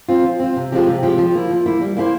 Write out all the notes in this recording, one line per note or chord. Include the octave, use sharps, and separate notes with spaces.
C4 F4
F3
C4 F4
C3
F3 G#3 C4 G4
C3
F3 G#3 C4 G4
F3
A#3 E4
F3
A#3 E4
G3
A#3 E4 G4 C5